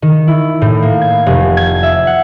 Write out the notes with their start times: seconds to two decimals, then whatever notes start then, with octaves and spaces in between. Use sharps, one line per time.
0.02 D#3
0.27 E4
0.62 A2
0.82 A#3
1.01 G#6
1.26 F1
1.57 G#6
1.83 E5
2.07 F#5